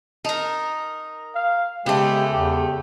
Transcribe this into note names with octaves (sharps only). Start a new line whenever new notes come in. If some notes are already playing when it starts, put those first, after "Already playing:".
D#4 A#4 A5
F5
C#3 G#3 A3 B3 G4
E2 G4